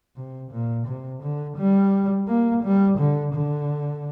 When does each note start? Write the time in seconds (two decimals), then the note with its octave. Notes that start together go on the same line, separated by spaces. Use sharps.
0.16 C3
0.52 A#2
0.87 C3
1.22 D3
1.57 G3
2.28 A#3
2.63 G3
2.98 D3
3.34 D3